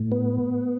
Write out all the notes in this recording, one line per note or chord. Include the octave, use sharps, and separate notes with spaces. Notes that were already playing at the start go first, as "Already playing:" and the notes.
Already playing: A2
B3